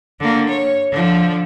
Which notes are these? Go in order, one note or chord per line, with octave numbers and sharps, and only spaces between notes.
D3 A#3
C#5
D3 F3